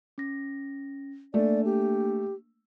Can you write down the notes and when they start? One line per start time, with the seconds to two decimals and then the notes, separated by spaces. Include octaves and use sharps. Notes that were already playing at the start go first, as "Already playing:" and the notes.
0.18 C#4 A#6
1.34 A3 A#3 D4 D5
1.65 G4